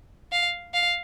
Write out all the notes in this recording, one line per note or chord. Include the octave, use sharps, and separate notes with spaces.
F5
F5